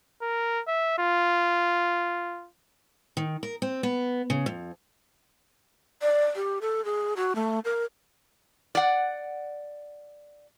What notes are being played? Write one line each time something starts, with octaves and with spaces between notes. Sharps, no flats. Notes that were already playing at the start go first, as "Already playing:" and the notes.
A#4
E5
F4
D#3
A#4
C4
B3
C#3
F2
D5
G4
A4
G#4
F#4
A3
A#4
D5 F#5